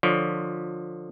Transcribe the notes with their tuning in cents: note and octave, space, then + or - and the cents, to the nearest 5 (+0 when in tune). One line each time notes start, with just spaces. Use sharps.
D3 +30 F3 +20 C#5 +25